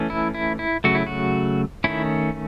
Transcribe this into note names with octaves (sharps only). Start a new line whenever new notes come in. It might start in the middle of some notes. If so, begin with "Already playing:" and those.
Already playing: E3 A3 C#4
E4
E4
E4
C#3 F#3 A3 F#4
E4
F#4
D#3 A3 C#4 E4